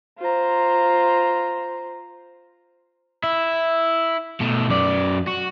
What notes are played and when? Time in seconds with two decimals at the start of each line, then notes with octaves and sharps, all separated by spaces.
0.20 F4 C5 A#5
3.23 E4
4.40 B2 A3
4.70 F#2 D5
5.27 F#4